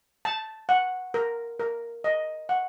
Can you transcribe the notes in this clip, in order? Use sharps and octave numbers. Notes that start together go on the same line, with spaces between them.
A5
F#5
A#4
A#4
D#5
F#5